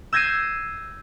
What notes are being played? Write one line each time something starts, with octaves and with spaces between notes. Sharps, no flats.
E6 G6 G#6 A#6 C7 D#7